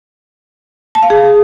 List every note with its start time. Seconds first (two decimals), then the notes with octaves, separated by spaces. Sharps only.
0.95 A5
1.03 F5
1.10 G#4